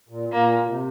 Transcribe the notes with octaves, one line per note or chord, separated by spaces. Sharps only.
A#2
A#2 A#3
A#2
C3